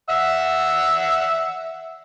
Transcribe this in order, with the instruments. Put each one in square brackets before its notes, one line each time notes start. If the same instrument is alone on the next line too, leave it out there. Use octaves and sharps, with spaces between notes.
[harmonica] E5 F#5 E6